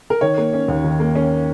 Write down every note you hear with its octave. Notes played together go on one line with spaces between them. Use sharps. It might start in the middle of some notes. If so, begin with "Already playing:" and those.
A#4
D#3 C#5
A#3
C#4
D#2
D#3
A#3
C#4